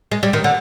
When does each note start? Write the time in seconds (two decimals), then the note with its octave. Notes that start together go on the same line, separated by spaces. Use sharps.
0.12 G#3
0.23 G3
0.33 D#3
0.44 D3